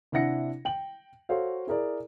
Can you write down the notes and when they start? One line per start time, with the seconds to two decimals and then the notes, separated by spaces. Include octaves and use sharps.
0.12 C3 D4 E4 F#5 A#6 C#7
0.65 G5 F#7
1.29 F#4 A4 C5 C#5 F5
1.67 E4 G#4 A#4 D5